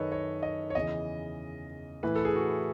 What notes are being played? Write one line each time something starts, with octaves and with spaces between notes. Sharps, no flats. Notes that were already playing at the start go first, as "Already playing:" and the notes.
Already playing: F#2 D#3 A4 B4 C#5 D#5
C#5
D#5
C#5
E2 C#3 E3 D#5
A2 E3 B4
A4
G#4
F#4